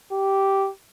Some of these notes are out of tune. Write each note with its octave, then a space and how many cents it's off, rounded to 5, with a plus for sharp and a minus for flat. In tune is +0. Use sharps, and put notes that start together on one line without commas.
G4 -10